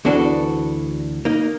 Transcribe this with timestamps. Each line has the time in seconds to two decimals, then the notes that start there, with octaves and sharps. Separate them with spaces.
0.05 D2 E3 B3 D4 F#4 A4
1.25 A#3 D#4